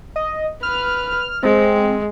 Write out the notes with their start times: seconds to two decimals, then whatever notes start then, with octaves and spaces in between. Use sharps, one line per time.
0.16 D#5
0.63 B4 F6
1.43 G#3 C4